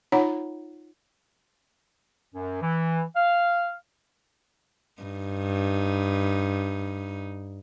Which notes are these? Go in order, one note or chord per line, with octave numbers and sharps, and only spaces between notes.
D#4 F4 C#5 F#5 A#5 B5
F#2
E3
F5
G2 D#4